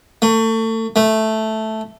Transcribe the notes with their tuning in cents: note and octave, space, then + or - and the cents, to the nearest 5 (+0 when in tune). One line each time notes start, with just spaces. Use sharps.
A3 +30
A3 -5